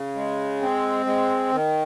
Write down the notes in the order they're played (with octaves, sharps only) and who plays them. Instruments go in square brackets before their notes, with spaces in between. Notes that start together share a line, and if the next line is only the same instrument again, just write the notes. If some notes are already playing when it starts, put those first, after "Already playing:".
Already playing: [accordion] C#3
G#3
C4
G#3
D#3